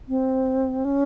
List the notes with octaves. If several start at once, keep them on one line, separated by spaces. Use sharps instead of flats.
C4
C#4